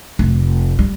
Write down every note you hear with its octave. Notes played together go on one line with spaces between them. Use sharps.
F1
G3